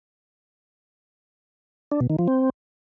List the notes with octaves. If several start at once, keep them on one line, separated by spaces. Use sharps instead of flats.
D4
B2
D#3
F3
C4